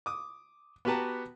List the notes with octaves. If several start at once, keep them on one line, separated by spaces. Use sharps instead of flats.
D6 D#6
B3 F#4 G4 B4 A5 A#5